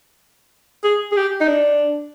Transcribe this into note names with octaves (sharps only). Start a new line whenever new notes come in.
G#4
G#4
G4
D#4
D4